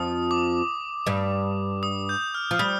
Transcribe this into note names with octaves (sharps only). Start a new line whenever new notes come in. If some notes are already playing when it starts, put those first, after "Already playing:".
Already playing: F2 F3 D#6
D6
G2 G3
D#6
G6
F6
F3 F6
G3 D#6